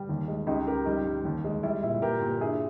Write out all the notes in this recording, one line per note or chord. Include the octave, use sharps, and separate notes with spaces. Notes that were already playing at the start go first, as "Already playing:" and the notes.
Already playing: G3
D#2
G#3
C#2 D#4 G4
C#2 G4 A#4
G3 D#4 G4
G3
D#2
G#3
G3 E4
A#2 E4
A#2 G4 A#4
A#2
A#4
G2 E4 G#4